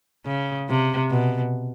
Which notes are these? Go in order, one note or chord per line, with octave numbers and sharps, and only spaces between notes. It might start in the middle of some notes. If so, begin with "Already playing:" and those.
C#3
C3
B2